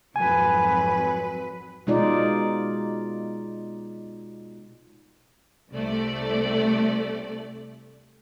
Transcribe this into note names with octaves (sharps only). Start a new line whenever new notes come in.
G#1 F2 F#3 B4 G#5
B2 G#3 D#4 F4 D5
C2 C3 A3 D5